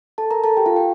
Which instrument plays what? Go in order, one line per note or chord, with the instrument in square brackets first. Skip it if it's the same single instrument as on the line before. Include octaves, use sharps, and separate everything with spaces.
[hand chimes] A4 A5
A#4 A#5
A4 A5
G4 G5
F4 F5
G4 G5